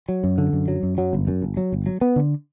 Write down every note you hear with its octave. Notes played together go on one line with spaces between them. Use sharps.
F#3
F#2
D3
F#2
F#3
F#2
F#3
G1
F#2
G1
F#3
G1
F#3
B3
D3